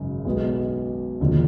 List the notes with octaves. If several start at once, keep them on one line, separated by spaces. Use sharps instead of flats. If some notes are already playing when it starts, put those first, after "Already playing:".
Already playing: G#1 F#2 C#3
B1 B2 G#3 B3
E1 D#2 D3 F3